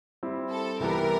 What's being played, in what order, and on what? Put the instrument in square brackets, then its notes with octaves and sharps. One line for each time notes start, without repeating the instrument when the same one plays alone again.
[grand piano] G3 C4 E4
[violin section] A4
[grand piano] C2 C3 E3 G3 B3 [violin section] A#4